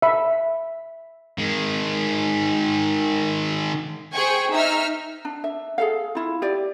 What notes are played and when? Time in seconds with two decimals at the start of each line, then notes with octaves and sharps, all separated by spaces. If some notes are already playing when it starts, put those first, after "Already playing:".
0.02 E5 B5
1.38 D#3 G#3
4.11 G#4 C5 G5 G#5 C#6
4.51 D#4 E5 E6 F6
5.25 D4
5.44 E5
5.78 G#4 A4 F5
6.15 E4 F4
6.42 G4 D5